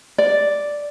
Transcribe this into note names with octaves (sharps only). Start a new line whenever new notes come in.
D5